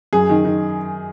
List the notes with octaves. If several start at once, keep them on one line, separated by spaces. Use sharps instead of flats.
F#2 G#4
D#3
D#3